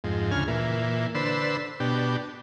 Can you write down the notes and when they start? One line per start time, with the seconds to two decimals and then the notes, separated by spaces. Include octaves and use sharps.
0.04 F2 G#2
0.31 D2 C#3 G#5 F6
0.48 A#2 E3
1.15 D3 B4 C5 E6
1.80 B2 D4 G4